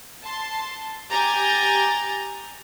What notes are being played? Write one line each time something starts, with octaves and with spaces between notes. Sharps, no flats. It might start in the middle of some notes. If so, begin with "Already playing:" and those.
A5 C6
G4 G#5 A#5 D6 G6 A6